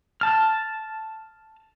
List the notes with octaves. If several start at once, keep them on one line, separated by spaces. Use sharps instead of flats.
A5 F6